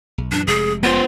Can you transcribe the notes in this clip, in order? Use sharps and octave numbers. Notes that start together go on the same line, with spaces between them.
B1
F#2 A#2 E3 D4
F1 C3 G#3 G#4
B3 F4 C5